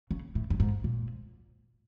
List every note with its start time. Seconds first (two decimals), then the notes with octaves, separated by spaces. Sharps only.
0.11 C#3
0.35 A2
0.50 G2
0.60 G#2
0.84 A#2